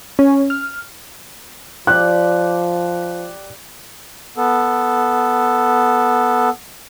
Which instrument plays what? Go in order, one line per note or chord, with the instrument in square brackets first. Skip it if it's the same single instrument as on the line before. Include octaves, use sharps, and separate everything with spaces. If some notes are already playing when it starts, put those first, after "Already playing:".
[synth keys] C#4
F6
[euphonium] F3 [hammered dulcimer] G4 D5 [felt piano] F#6
[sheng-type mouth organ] B3 A4